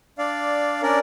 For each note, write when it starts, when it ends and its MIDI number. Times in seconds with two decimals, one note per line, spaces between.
0.18 0.82 62
0.18 0.82 74
0.18 0.82 77
0.82 0.99 61
0.82 0.99 62
0.82 0.99 70
0.82 0.99 74